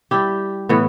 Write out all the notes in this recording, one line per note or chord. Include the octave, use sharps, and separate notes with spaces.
G3 E4 G4
A2 E3 B3